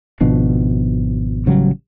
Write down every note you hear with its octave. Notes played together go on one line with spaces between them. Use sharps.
G#1 B2 F3 D4
A1 C#3 F#3 G3